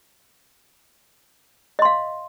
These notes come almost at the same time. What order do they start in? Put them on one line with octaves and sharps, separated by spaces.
D#5 C6 F5